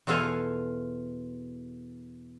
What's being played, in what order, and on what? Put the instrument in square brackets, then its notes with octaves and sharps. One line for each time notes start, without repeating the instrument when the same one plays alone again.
[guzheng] E2 B2 F4 A4 F5 G#5